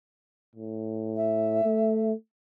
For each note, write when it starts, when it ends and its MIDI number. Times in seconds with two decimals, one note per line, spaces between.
0.56 1.63 45
1.16 2.12 76
1.65 2.13 57